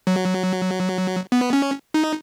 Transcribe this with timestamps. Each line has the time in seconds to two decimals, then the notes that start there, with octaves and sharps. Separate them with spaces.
0.07 F#3
1.32 B3
1.53 C#4
1.94 D#4